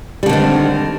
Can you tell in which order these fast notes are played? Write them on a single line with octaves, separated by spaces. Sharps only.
G3 D3 D#3 C4